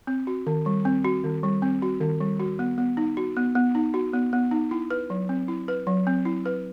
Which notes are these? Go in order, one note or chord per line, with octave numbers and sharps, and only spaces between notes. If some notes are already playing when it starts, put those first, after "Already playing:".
C4
F#4
D#3
G3
C4
F#4
D#3
G3
C4
F#4
D#3
G3
F#4
B3
B3
D#4
F#4
B3
B3
D#4
F#4
B3
B3
D#4
E4
B4
F#3
C4
E4
B4
F#3
C4
E4
B4